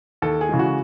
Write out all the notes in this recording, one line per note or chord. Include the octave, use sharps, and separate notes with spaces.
D#2 A4
G#4
C#3 E3 G#3
F#4